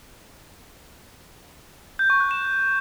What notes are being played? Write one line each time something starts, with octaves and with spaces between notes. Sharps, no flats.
G6
C#6
F#6
E7